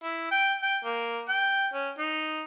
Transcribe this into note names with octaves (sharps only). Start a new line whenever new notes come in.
E4
G5
G5
A#3
G5
C#4
D#4